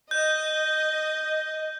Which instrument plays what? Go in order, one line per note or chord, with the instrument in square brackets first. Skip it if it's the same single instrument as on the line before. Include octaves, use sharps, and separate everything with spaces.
[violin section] D#5 [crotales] G6